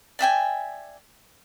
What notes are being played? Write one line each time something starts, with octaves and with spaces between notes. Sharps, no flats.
D5 E5 G5 G#5